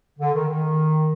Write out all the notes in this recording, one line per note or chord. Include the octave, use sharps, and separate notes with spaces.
D3
D#3
D#3